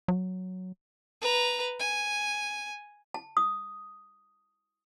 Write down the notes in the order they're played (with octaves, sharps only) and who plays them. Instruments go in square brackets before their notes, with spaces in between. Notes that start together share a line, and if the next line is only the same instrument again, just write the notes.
[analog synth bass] F#3
[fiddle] B4 A#5
G#5
[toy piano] A5
D#6